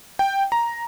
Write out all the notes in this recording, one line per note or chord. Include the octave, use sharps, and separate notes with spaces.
G5
A#5